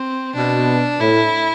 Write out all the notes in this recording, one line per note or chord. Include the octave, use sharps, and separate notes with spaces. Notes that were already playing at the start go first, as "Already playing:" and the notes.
Already playing: C4
B2 D4
A2 E4